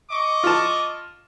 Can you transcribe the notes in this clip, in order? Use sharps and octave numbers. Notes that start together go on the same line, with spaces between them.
D#5 C#6 D6
F4 A5